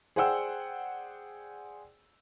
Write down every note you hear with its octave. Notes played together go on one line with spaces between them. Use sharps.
G#4 C5 D5 F#5 G5 E6